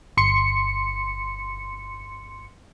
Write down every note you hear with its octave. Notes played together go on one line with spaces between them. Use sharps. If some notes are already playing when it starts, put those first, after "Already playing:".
G1 C6 C#7